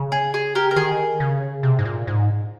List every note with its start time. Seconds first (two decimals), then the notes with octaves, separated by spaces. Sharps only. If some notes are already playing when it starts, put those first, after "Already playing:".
Already playing: C#3
0.12 G#4
0.34 G#4
0.55 G4 A#4
0.71 A#4
0.76 D#3 G#4
1.20 C#3
1.63 C3
1.79 G#2
1.85 A#2
2.07 G#2